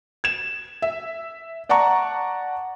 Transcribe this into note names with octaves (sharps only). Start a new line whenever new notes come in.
G#6 E7
E5
D5 F#5 A5 A#5 C#6